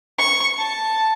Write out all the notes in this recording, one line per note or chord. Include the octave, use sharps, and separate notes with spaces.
C#6
A5